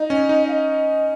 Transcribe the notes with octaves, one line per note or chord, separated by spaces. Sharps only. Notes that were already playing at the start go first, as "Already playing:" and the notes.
Already playing: D#4 D#5
C#4
D#4
F5
D#5